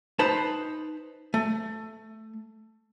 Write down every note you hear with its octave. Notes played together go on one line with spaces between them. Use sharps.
D#4 B4 C5 A5
A3